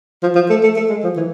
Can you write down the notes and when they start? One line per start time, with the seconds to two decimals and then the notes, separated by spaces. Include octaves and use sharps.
0.23 F3
0.35 F3
0.50 A3
0.63 A3
0.76 A3
0.89 G#3
1.04 F3
1.17 E3